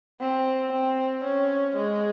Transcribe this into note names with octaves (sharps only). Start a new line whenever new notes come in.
C4
C4
C#4
G#3